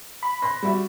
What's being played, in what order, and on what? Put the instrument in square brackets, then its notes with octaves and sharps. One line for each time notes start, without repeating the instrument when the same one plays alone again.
[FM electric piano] B5
[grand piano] C6 F#6 A#6
G3 F#4 E5